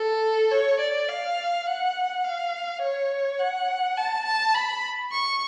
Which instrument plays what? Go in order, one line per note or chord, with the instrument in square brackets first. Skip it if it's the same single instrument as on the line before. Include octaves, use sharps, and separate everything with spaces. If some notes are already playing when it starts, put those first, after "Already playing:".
Already playing: [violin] A4
C#5
D5
F5
F#5
F5
C#5
F#5
A5
A5
B5
C#6